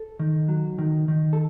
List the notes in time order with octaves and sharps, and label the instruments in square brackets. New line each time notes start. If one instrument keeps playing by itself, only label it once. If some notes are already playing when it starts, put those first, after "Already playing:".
Already playing: [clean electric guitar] A4
D#3
F#3
D#3
D#3
A4